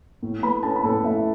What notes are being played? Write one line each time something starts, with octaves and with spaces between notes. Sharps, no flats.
A2
A3 B4 B5
C#4 A4 A5
B5
A2 A4 A5
A2 E5